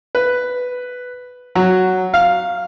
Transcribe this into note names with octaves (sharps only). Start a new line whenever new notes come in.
B4
F#3
F5